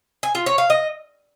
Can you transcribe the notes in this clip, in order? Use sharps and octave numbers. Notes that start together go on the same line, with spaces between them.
G#5
F4
C#5
F5
D#5